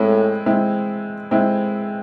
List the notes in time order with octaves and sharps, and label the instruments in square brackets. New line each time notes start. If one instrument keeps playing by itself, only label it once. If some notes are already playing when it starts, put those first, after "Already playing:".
Already playing: [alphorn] A2 [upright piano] G#3 C4 E4
[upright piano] G#3 C4 E4
G#3 C4 E4